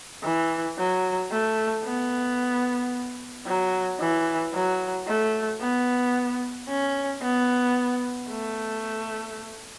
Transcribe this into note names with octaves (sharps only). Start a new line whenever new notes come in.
E3
F#3
A3
B3
F#3
E3
F#3
A3
B3
C#4
B3
A3